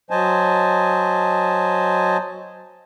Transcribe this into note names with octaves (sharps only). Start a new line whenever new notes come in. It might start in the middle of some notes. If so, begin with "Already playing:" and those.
F#3 C5 D#5 G#5 A5